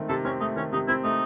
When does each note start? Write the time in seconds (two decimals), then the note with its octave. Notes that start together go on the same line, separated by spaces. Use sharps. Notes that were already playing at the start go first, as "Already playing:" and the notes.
Already playing: D#3 A3 C4
0.09 C3 A4
0.25 C4 C#4
0.41 A3 D#4
0.56 D#3 C#4
0.73 C3 D#4
0.88 C4 E4
1.04 A3 D#4